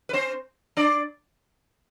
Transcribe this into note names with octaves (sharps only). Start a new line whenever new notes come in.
B4
C4 C5
D4 D5